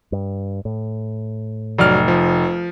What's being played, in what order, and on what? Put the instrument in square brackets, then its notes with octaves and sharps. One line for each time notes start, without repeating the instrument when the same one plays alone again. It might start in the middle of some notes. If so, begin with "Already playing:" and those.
[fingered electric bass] G2
A2
[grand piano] F1 [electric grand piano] F#3 D5 F6
[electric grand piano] F3